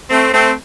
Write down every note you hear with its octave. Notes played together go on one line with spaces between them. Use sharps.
A3 C4
A3 C4